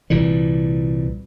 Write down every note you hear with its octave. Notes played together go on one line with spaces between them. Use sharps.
C2 A#2 E3 G3